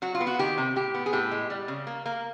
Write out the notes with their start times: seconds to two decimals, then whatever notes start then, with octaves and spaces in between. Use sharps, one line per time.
0.02 F#3 F#4
0.15 F4
0.21 B3
0.27 F#4
0.39 D#3 G4
0.58 C3
0.76 A2 G4
0.94 B3
1.06 G#4
1.13 A2 G4
1.31 G#3
1.50 G3
1.68 C#3
1.87 A#3
2.06 A#3